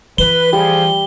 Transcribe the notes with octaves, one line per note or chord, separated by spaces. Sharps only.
E3 B4 G7
F3 G3 G#4